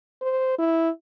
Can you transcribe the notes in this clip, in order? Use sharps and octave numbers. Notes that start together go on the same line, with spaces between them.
C5
E4